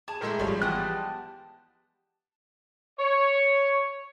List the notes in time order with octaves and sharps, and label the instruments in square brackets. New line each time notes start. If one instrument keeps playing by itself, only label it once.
[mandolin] G#4 [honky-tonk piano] A5
[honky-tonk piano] A2 G#3 A3 [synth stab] A#4 E5
[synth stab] G#1 [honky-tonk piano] F3 G3 G#3 [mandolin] C#5
[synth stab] E3 B3 [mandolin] G4 D#6 [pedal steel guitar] A5 F#6
[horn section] C#5